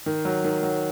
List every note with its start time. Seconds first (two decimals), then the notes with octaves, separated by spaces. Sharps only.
0.06 D#3
0.25 F#3
0.44 D#3
0.63 F#3